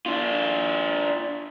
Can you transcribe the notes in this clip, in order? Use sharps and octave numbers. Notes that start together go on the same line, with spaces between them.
D4 F4